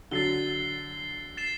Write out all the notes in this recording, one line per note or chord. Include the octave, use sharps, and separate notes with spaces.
D3 F#3 A6 C7 G7
A6 C7 E7